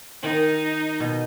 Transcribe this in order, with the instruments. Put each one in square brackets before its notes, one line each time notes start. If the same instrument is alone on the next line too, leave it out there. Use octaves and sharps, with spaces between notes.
[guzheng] D#3 [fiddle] D#4
[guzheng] B2